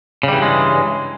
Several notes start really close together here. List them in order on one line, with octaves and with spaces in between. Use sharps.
C#3 G3 E3 G2 G#3